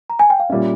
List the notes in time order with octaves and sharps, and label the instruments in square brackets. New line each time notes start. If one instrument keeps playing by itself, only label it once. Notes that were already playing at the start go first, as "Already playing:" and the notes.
[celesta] A#5
G#5
G5
F5
[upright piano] A#2 G3 C#4 [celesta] E5